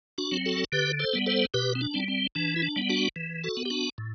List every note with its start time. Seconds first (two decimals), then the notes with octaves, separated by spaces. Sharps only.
0.18 D4 F#4
0.32 F#3 C4
0.46 F#4 A4
0.72 D3 G4 B4
0.99 A4 C5
1.13 G3 B3
1.26 A4 C5
1.54 B2 G4 B4
1.75 C4
1.81 D4
1.94 G3 C4
2.08 C4
2.35 E3 D4
2.56 E4
2.62 D4
2.76 G3 B3
2.89 D4 F#4
3.16 E3
3.44 F#4 A4
3.57 B3
3.65 G4
3.70 D4 F#4
3.98 A2